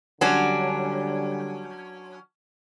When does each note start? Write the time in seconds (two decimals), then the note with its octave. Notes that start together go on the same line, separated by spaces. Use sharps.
0.21 D3 F#3 G3 C#4 D4